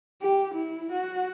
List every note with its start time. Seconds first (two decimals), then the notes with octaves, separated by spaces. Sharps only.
0.22 G4
0.54 E4
0.92 F#4